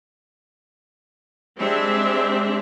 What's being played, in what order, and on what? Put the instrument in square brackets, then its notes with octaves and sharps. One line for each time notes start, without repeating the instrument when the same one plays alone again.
[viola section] G3 G#3 C4 D4 G#4 E5